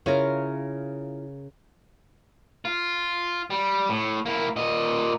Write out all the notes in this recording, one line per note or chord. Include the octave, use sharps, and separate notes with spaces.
C#3 E4 F4 A#4 C#5
F4
G3
A2
A#3 E4
A#2 D#5